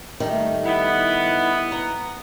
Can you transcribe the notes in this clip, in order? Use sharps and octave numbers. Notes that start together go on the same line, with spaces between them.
D#3 G3 A3
B3 E4
A#5